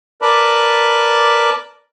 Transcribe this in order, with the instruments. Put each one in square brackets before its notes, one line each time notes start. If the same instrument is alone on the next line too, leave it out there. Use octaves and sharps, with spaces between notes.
[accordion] A#4 B4 D5 A5 B5 D6